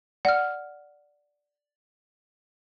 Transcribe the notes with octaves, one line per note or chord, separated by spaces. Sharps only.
D5 F#5 F6